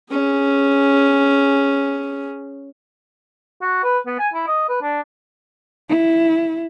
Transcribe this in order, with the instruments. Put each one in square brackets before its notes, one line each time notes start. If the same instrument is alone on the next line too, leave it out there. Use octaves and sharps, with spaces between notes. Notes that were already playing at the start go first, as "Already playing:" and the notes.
[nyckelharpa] C#4 G#4
[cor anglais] F#4
B4
B3
G#5
E4
D#5
B4
D4
[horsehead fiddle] E4